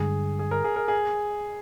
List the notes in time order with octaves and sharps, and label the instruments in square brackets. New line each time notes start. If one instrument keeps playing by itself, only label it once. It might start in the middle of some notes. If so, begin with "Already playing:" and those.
Already playing: [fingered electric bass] G2 D3 G#3 [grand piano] G#4
[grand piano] G#4
A#4
G#4
A#4
G#4